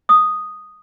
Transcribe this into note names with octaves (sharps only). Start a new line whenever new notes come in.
D#6